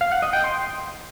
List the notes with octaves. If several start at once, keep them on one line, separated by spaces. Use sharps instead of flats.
F5
F#5
D#5
G5
C6